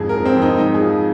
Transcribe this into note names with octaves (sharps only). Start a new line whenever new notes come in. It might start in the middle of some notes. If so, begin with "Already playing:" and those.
Already playing: F2 G#2 G#4
A#4
F2
C4
F2
D#4
G#2 D#4
G#4
F3